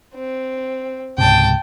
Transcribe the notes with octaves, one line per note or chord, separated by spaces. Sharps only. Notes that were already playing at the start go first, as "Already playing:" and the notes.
C4
C#2 G#2 C3 G5 A5